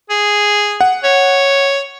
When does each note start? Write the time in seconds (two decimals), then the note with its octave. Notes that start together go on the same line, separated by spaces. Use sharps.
0.10 G#4
0.81 F#5
1.04 C#5